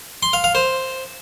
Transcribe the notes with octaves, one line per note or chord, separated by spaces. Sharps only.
C6
F5
F5
C5